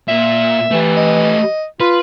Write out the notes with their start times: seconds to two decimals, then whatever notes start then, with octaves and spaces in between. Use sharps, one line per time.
0.08 A#2 E5
0.71 E3 A3 G4
0.97 D#5
1.80 F4 B4